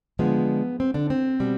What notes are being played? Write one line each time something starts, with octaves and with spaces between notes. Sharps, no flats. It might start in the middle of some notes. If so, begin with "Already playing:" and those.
D3 F3 G#3 B3
C4
D3 D4
C4
B2 G3